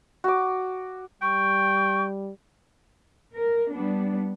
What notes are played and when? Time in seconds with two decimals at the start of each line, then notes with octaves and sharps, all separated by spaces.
0.24 F#4 D6
1.22 G3 G5 C#6
3.33 A#4
3.72 G3 B3 D4